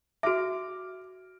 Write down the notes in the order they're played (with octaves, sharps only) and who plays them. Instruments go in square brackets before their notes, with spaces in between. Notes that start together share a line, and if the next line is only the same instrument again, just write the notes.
[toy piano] F#4 E5 [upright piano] D6 F6 D7